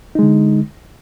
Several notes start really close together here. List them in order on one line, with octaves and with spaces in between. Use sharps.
D#4 G#3 D3